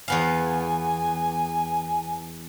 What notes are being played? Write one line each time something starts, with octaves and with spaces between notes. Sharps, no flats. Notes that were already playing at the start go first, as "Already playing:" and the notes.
E2 B3 F5 G#5